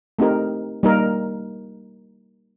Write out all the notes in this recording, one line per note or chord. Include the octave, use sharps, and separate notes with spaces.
A3 C4 D#4 G4 A#4
G3 A#3 D#4 A#4